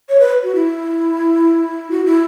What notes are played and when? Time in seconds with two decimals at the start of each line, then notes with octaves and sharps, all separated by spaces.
0.09 C#5
0.20 B4
0.44 F#4
0.55 E4
1.91 F#4
2.06 E4